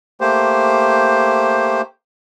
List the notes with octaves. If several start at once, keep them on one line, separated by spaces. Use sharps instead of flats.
A3 A#3 G4 C5